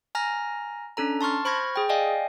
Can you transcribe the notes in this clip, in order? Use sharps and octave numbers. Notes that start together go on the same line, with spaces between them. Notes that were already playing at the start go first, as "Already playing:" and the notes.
G#5 A#5 F6 A#6
C#4 D4 A4 A#5
A5 C6 C#6 F6 A6
C5 B5 C#6 F6 G#6 A#6
G#4 G5
D5 D#5 F5 G5 G#5